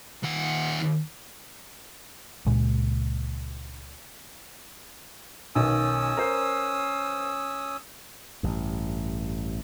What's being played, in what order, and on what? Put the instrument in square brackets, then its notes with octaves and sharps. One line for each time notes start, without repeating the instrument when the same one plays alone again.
[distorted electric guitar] D#2 F#5
[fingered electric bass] C#2 A#2 G#3
[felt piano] B1 D#3 [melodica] C#4 D#6 E6
[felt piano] A#4 C5
[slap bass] A1 G2